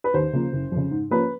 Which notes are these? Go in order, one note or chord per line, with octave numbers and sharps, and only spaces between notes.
B4
D#2 C5
C#3 F3 A#3
F#1
F2 C#3
G#2
F3 A#3 C#4 B4